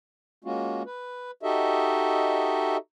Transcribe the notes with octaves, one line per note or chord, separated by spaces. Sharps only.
G#3 A#3 C#4 F4 F#4
B4
D#4 F#4 G4 A4 D#5 E5